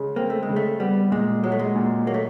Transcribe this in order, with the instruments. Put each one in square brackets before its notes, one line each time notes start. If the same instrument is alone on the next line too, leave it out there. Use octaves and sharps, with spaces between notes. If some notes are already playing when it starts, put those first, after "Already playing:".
Already playing: [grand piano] C#3 G#3
[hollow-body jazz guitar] A#3 [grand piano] C4
[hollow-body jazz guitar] A3
G#3
[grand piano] C#3
[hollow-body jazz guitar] A3
[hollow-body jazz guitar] G3 [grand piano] B3
[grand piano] A#2 [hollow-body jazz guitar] G#3
[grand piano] F#3 [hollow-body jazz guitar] G#3
[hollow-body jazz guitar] A3
G#3
[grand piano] A#2
[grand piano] F#3 [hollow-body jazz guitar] A#3
[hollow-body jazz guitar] A3